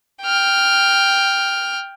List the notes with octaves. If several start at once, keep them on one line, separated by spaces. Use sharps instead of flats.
G5 F6